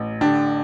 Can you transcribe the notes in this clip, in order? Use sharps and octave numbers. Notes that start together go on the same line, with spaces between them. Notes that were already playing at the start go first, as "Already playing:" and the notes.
Already playing: A1
D3 D4 G4